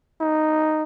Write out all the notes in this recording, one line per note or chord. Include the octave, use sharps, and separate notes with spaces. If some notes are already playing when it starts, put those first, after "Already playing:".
D#4